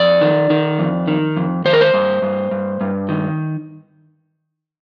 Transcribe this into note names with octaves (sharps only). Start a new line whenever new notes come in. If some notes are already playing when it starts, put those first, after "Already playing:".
Already playing: F2 D5
D#3
D#3
F2
D#3
F2
D#3 C5
A#4
C5
G2
G2
G2
G2
D#3